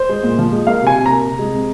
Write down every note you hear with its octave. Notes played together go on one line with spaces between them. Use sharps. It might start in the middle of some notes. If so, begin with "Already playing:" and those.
Already playing: C5
G#3
A#2
F3
G#3
A#3 F5
C3
G#5
C3
A#3 A#5
C3
G#3
C4